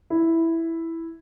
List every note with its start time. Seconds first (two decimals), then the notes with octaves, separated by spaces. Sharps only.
0.10 E4